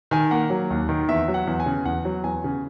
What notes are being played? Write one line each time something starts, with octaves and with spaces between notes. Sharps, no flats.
D#3 G#5
A#3 F#5
F#3
D#2
D#3
E2 E5
F#3
F#5
E2
G#5
C#3
E2 F#5
F#3
E2 G#5
C#3